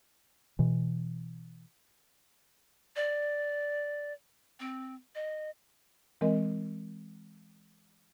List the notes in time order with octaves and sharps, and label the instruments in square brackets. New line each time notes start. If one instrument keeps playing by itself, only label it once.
[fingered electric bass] B2 E3
[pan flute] D5
C4
D#5
[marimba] E3 G#3 C4 A#4 D#5